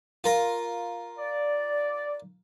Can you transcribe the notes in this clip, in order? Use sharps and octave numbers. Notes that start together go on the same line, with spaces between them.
F4 A#4
D5